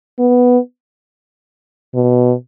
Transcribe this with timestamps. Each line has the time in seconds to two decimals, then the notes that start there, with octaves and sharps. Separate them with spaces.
0.19 B3
1.94 B2